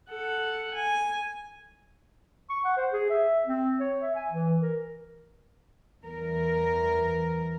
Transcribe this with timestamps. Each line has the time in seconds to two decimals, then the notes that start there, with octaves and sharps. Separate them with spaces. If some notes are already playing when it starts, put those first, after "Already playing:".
0.10 A4 F#5
0.75 G#5
2.49 C#6
2.65 F#5
2.77 C5
2.92 G#4
3.10 E5
3.46 C4
3.80 C#5
4.01 E5
4.15 G#5
4.31 E3
4.62 A#4
6.03 E2 A#4